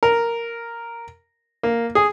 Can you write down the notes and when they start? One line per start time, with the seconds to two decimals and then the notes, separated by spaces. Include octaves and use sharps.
0.03 A#4
1.63 A#3
1.95 G#4